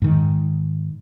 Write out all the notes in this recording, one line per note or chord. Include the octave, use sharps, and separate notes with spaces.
G#2 D#3